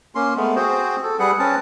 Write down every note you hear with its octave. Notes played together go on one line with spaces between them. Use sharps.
A#3 C#4 C6
G#3 A3 B3
C4 F#4 G#4 C5
A4
G3 G#4 B4 F#5
C4 C#4 B4 A5